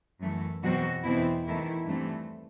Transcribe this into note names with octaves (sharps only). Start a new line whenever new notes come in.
F#2 E3 A3
E2 B2 F#3 C4 F#4
E2 B2 A3 C4 E4
E2 D#3 A3 E4
G2 E3 A3 C4